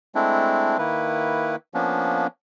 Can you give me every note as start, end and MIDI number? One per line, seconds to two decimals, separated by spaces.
0.15 0.78 56
0.15 0.78 57
0.15 0.78 60
0.15 0.78 62
0.15 0.78 64
0.78 1.56 51
0.78 1.56 58
0.78 1.56 64
0.78 1.56 71
1.74 2.27 53
1.74 2.27 58
1.74 2.27 59
1.74 2.27 61
1.74 2.27 62